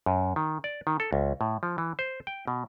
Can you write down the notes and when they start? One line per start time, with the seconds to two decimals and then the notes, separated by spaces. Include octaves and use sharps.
0.06 F#2
0.36 D#3
0.64 D5
0.87 D#3
1.00 A4
1.13 C#2
1.41 A2
1.63 F3
1.78 E3
1.99 C5
2.27 G5
2.48 B2